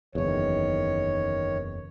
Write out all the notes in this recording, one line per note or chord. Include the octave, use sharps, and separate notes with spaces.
F#1 E2 D#3 C#5